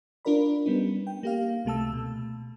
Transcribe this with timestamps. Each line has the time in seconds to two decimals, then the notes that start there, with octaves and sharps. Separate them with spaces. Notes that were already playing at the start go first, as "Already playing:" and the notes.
0.25 D4 F4 A#4 D5 B5
0.66 G3 B3 C#4 D#4
1.07 G5
1.23 A#3 G4 F5
1.65 C#2 C3 A3 A5 E6
1.93 B2